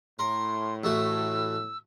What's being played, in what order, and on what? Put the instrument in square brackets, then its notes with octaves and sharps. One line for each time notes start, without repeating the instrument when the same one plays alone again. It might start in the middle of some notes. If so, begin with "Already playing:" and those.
[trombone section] A2 [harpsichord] A#4 [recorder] C6
[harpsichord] A1 A3 F#4 [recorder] E6